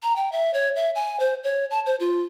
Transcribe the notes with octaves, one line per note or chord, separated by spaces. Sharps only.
A#5
G5
E5
C#5
E5
G#5
C5
C#5
A5
C5
F4